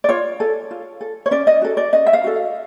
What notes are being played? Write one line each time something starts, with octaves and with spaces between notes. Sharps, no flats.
D5
F4 C#5
A4
F4
A4
C#5
C#4 D5
D#5
F#4 A4
D5
C#4 D#5
E5
F5
F#4 A4